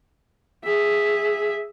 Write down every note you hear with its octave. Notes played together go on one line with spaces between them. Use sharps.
G#4 E5